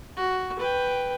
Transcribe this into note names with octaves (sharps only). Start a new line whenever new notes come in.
F#4
B4 G5